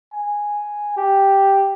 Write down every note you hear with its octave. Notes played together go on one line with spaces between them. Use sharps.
G#5
G4